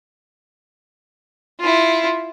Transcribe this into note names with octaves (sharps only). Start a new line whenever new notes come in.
E4 F4